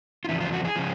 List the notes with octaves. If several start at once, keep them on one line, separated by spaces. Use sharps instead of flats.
F4
E2 C#3 F3 E4
F4
F#4
G#4
C#3 F3